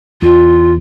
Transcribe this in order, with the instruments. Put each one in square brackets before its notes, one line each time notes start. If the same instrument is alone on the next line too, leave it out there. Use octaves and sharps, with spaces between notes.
[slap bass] E2 [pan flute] F4